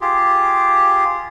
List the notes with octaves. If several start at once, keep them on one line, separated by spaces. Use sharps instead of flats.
F4 G4 G#4